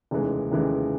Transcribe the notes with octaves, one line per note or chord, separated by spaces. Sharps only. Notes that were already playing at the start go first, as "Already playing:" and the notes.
F1 D#2 C#3 E3 G#3
F1 D#2 C#3 E3 G#3